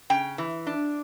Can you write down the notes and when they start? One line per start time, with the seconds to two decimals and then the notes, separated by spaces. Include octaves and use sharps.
0.10 C#3 G5
0.38 E3
0.67 D4